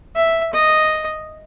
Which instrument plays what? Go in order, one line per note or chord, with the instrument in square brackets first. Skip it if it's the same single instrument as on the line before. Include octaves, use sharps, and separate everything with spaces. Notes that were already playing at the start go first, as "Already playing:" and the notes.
[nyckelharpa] E5
D#5